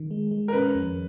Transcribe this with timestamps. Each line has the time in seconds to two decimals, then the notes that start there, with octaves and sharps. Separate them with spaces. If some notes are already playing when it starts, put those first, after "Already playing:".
Already playing: D#3
0.11 G#3
0.31 G#3
0.48 A#4
0.53 C#4 B4
0.75 F2